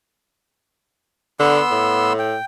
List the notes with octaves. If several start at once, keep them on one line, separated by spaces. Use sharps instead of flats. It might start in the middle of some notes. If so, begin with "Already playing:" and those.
D3 B3 C6 E6
A2
G5